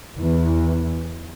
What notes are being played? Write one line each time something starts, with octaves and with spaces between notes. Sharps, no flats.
E2 E3